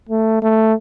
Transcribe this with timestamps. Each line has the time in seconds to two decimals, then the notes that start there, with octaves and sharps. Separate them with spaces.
0.09 A3
0.42 A3